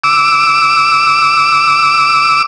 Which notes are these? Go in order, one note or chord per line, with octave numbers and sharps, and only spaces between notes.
D6 E6